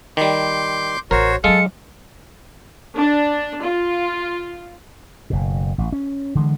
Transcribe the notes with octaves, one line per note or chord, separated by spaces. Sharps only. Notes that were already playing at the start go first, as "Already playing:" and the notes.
D#3 G3 C6 D6 G6
A1 F#4 A#4 C5 C#5
F#3 G#3 D4 A4 F5 C#7
D4
F4
F#1 B2
A1
C#4
D3 E3 G#3